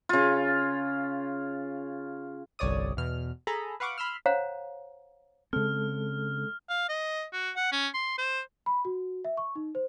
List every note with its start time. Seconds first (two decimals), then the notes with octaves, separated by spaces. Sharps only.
0.09 C#3 F4
2.59 G1 C2 C#5 D5 D#6
2.97 E2 B2 F6
3.47 G#4 A4 A#5 B5
3.80 B4 F5 F#5 C#6 D6
3.98 B5 C6 E6 F6
4.26 C5 C#5 F5 F#5 A#5
5.53 C#3 G#3 C4 A4 F6
6.69 F5
6.89 D#5
7.32 F#4
7.56 F#5
7.72 C#4
7.94 C6
8.18 C5
8.66 B5
8.85 F#4
9.25 E5
9.37 C#6
9.55 D#4
9.75 C5